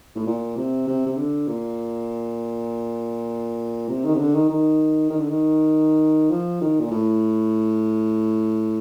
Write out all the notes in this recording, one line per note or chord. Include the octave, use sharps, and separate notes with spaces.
A2
A#2
C3
C3
C3
D3
A#2
C3
D#3
C3
D3
D#3
D#3
D#3
D3
D#3
F3
D#3
A#2
A2